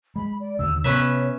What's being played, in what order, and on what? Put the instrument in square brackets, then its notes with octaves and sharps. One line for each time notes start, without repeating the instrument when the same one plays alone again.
[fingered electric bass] G#3 [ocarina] B5
[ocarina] D5
[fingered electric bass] D#2 D3 [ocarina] E6
[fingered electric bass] C3 B3 [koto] C#4 B4 E5 [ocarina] C#5